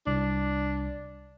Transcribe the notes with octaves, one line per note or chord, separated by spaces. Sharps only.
C2 D4